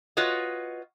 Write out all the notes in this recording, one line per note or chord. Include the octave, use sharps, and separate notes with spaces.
F4 F#4 B4 C#5 D#5